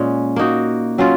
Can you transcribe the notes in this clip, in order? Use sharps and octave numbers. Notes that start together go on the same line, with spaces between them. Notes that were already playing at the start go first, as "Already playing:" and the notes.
Already playing: A#2 G#3 C#4
A#3 D#4 F#4
F#3 C#4 F4